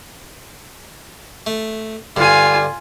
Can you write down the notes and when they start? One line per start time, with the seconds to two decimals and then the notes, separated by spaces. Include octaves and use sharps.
1.47 A3
2.16 G2 D3 F4 G#5